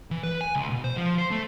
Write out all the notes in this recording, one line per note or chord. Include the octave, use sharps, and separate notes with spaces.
E3
B4
G#5
C#2
B2
C5
F3
C5
A3